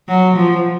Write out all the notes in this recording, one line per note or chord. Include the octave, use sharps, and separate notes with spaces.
F#3
F3